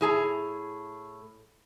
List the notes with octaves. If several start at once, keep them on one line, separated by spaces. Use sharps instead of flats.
A2 G#4 A5 A#5